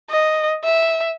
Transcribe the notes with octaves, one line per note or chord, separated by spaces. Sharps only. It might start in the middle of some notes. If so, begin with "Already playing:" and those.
D#5
E5